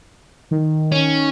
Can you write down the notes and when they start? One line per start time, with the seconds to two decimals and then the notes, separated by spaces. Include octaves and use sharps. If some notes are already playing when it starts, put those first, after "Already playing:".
0.51 D#3
0.92 C#4